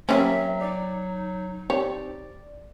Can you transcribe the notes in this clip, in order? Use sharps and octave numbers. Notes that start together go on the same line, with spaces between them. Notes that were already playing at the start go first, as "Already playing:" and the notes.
F#3 G3 A#3 C4 C#4 E5
D#4 D5
C4 G4 C#5 D5